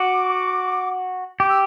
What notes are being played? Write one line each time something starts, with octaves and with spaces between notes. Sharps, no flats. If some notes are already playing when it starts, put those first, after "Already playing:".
Already playing: F#4 D6
G4 D6
E6